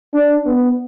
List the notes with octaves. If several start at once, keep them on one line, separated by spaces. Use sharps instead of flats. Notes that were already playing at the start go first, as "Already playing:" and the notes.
D4
B3